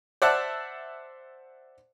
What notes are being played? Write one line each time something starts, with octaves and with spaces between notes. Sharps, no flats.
C5 D5 E5 F#5 A5 F#6